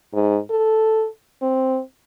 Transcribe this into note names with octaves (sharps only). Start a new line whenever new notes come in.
G#2
A4
C4